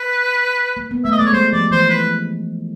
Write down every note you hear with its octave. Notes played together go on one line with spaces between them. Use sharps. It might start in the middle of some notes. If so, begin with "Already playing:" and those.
Already playing: B4
A#3
B3
A3 E5
D#5
G#3 D5
C#5
G3 C5
F3 D5
E3 C5
B4